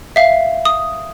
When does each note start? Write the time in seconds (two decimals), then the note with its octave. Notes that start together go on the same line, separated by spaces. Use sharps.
0.16 E5 F5
0.65 D#6